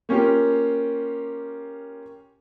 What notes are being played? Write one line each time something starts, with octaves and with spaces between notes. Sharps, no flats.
A#3 C#4 F4 G4